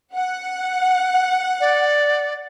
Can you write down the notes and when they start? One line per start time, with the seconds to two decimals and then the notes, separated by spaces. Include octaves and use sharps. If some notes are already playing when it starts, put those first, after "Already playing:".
0.13 F#5
1.60 D5